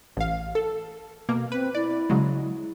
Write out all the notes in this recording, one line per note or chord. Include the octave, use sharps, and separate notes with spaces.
A1 F5
A4
B2 A#3
C4 B4
E4 D5
C#3 F#3 G#3